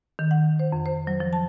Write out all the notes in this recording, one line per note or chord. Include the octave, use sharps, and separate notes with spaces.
D#3
F#5
C5
F2
C5
F#3
F3
A5